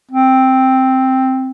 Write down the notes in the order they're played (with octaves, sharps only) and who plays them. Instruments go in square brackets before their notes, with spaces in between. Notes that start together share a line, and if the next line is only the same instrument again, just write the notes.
[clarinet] C4